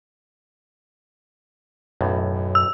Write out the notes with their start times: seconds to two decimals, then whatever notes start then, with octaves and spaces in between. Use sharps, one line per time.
2.01 B1 F#2 A2
2.55 E6